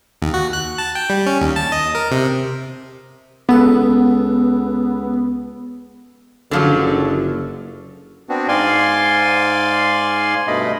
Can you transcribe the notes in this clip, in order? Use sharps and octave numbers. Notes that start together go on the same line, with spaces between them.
D#2
F#4
F#6
A5
G5
G3
C#4
D#2
A5
D#5
A#4
C3
C#2 B3 A4
F#1 D3 F3 F#3
B3 C4 D4 F#4
G#2 D5 F5 G#5 C6
G2 B2 A3 D#5 B5